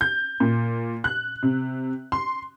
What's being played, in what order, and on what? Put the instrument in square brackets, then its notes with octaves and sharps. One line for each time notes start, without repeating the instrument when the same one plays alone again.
[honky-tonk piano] G6
A#2
F#6
C3
C6